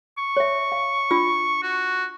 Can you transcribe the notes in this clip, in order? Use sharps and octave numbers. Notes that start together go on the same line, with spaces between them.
C#6
C#5 E5
F5
D4 F4 E6
F#4